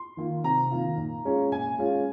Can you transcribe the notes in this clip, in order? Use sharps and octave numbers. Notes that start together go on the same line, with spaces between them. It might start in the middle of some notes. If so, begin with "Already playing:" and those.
Already playing: C6
D#3 A#3 F4
C3 A#5
D#3 A#3 F4
A#2
G#3 C#4 F4
A#2 G#5
G#3 C#4 F4